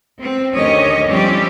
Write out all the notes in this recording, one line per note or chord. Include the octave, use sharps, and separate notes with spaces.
C4
D2 D#3 C#4 G4 C#5 D#5
F3 G3 C4 C#4 G4